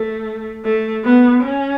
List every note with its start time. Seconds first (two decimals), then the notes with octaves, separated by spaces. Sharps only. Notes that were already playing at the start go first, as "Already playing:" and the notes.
Already playing: A3
0.65 A3
1.04 B3
1.43 C#4